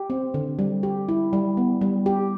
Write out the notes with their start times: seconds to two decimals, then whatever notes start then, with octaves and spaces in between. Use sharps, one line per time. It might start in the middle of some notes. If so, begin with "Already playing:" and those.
Already playing: G4
0.10 C4
0.34 D3
0.59 G3
0.83 G4
1.08 E4
1.33 G3
1.57 B3
1.81 G3
2.06 G4